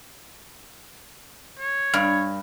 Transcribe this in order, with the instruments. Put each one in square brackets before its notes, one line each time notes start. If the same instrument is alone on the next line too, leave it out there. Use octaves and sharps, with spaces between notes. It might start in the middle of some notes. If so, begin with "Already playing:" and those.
[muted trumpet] C#5
[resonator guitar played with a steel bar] G2